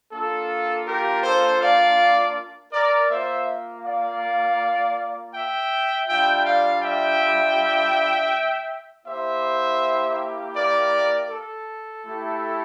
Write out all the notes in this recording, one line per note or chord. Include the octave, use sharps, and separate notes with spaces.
A#3 D4 F4 A4
G4 A#4
A4 C5
D5 F5
A#4 D5
A#3 F4 C5 E5
D5 F5
E5 G5
G3 D4 F4 E5 G5
D5 F5
E5 G5
A#3 E4 G4 C5 E5
A#4 D5
A4
A3 E4 G4